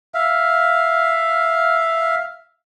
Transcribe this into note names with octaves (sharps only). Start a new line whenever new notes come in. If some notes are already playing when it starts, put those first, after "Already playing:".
E5 F5